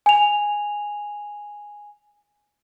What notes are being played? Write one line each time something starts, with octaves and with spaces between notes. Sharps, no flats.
G#5 F7